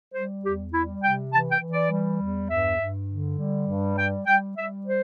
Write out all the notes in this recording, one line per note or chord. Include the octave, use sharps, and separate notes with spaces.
G3 C5
E2 G4
G3 E4
C3 G5
E3 A5
G5
E3
D5
G3
E2
G2 E5
G2
D3
G3
G2
G3 G5
G3 G5
G3 E5
C5